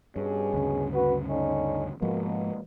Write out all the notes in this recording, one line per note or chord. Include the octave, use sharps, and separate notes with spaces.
G2 B2 C#4 G#4
D2 G2 C#3
F#4 B4
D3 C#4 D#4
G#2 B2 F3 G#3 A#3